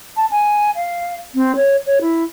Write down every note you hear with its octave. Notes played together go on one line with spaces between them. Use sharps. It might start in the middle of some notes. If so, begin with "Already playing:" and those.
A5
G#5
F5
C4
C#5
C#5
E4